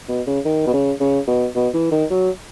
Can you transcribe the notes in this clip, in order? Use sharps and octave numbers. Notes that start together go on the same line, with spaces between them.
B2
C#3
D#3
B2
C#3
C#3
B2
B2
E3
D#3
F#3